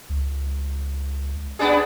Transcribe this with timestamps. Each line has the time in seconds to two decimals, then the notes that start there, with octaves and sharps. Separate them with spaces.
0.09 C#2
1.59 B3 D4 G#4